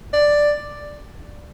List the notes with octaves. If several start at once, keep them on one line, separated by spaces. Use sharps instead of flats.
D5